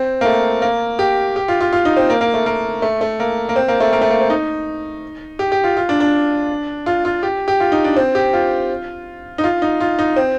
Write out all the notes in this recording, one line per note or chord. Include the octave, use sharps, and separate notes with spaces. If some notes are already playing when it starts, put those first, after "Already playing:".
Already playing: C4
A#3
A3
A#3
G4
G4
F4
F4
F4
D#4
C4
A#3
A#3
A3
A#3
A3
A3
A#3
A#3
C4
A#3
A3
A#3
A3
A#3
C4
D#4
G4
G4
F4
F4
D4
D4
F4
F4
G4
G4
F4
D#4
D4
C4
G4
F4
D#4
F4
D#4
F4
D#4
C4